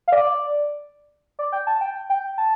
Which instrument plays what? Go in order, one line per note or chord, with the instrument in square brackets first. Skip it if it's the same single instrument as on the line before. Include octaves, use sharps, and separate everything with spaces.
[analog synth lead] F5
D5
D5
G5
A5
G5
G5
A5